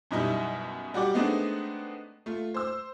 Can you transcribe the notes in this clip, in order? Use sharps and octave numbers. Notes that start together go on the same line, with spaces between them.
F#2 B2 G3 D#4 E4
G3 F#4 G4 D5 D6
G#3 A3 B3 C4 D4 D#4
A3 F4
C5 E6